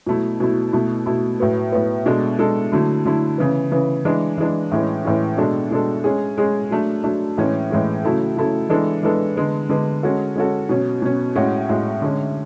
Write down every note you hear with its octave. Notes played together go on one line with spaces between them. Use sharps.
B2 F#3 A3 E4
B2 F#3 A3 E4
B2 A3 E4
B2 A3 E4
A2 F#3 B3
A2 F#3 B3
B2 G#3 D4 A4
B2 G#3 D4 A4
D3 F#3 A3 E4
D3 F#3 A3 E4
C#3 E3 B3
C#3 E3 B3
E3 G#3 D4
E3 G#3 D4
A2 E3 G#3 C#4
A2 E3 G#3 C#4
B2 G#3 D4 A4
B2 G#3 D4 A4
G#3 C#4 G#4
G#3 C#4 G#4
F#3 A3 D4
F#3 A3 D4
A2 E3 G#3 C#4
A2 E3 G#3 C#4
C#3 F#3 A3 E4 A4
C#3 F#3 A3 E4 A4
E3 G#3 B3 D4 A4
E3 G#3 B3 D4 A4
D3 G#3 B3
D3 G#3 B3
G#3 C#4 F#4 A4
G#3 C#4 F#4 A4
B2 F#3 C#4
B2 F#3 C#4
A2 G#3 C#4 F#4
A2 G#3 C#4 F#4
D3 G#3 C#4